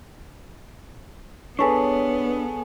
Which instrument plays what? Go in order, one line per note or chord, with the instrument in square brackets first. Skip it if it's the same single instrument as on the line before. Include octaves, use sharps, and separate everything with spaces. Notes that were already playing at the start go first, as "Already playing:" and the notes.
[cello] B3 [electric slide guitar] D4 B4 [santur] G#4 A4 C#5 [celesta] G#5 C#6